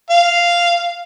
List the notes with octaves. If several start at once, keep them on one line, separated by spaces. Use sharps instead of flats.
F5